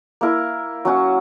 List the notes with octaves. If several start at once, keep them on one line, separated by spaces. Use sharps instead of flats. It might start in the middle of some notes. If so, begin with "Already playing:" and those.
A#3 E4 A#4
F#3 C#4 F#4